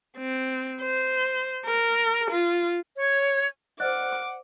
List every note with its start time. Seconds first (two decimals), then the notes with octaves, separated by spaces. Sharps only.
0.18 C4
0.81 C5
1.66 A#4
2.31 F4
2.98 C#5
3.80 C5 D5 D#5 F#5 D6 F6 F#6